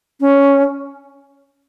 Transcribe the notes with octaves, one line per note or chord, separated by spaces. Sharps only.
C#4